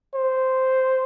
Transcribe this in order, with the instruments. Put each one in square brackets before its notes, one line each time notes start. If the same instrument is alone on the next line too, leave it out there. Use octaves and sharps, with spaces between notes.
[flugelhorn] C5